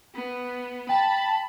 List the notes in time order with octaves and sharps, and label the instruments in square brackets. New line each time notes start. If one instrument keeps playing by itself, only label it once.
[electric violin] B3
[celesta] G5 [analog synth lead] A5 [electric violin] B5